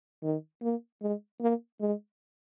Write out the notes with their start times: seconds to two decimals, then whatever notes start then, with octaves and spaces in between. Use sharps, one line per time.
0.23 D#3
0.62 A#3
1.02 G#3
1.41 A#3
1.81 G#3